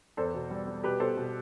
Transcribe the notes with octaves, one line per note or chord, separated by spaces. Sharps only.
E2 A4 C5
B2
G3
G3
B2 G4 B4
B2 A4 C5
B2